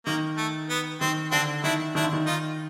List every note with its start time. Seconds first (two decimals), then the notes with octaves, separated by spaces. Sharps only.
0.06 D#3 A#3
0.37 A3
0.70 B3
1.01 D#3 C4
1.32 D3 C4 D4
1.63 D#3 D4 E4
1.95 D#3 D4 E4
2.03 D3
2.13 D#3
2.26 D#4 F4